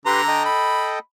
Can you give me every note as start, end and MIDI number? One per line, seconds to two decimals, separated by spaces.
0.06 0.44 50
0.06 0.21 67
0.06 0.21 71
0.06 0.44 82
0.06 0.21 84
0.28 0.99 69
0.28 0.99 75
0.28 0.99 79
0.45 1.00 83